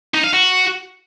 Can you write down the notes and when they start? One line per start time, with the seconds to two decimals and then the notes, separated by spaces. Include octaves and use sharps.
0.14 D#4
0.24 F5
0.33 F#4